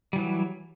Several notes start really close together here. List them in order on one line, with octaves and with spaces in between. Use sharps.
G3 E3 F#3